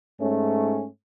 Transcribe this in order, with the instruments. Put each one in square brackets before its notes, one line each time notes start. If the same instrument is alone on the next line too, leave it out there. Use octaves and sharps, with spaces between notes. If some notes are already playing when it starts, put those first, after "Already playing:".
[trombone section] G#2 A3 C#4